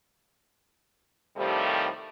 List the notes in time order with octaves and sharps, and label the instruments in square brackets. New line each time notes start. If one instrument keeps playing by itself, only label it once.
[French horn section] A2 C3 D#3 F3 G3 A3